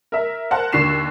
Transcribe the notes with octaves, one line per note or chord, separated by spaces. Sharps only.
A#4 E5
A#4 C5 F#5 A5
D#2 D3 C#6 C7 E7